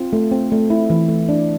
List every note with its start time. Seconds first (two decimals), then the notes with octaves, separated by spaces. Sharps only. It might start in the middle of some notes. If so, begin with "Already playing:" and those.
Already playing: C4 F4
0.13 A3
0.32 C4
0.52 A3
0.70 A3 E4
0.90 E3
1.09 A3
1.29 D4